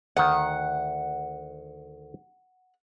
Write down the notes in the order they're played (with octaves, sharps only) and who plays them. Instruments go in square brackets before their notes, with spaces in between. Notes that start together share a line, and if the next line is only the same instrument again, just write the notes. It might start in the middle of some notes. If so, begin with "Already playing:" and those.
[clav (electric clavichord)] D2 D#3 [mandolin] F#5